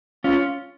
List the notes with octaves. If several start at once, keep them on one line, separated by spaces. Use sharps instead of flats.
C#4 F4